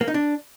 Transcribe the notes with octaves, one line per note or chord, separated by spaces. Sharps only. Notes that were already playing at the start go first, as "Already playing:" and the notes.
A#3
D#4
D4